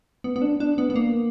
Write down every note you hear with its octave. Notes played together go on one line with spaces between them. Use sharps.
B3
B3
D4
D4
B3
B3
A#3